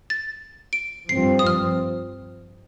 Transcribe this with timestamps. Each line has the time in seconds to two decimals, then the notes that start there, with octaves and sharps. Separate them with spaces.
0.10 A6
0.73 D7
1.09 G2 F3 C4 C7
1.39 D#6
1.46 F6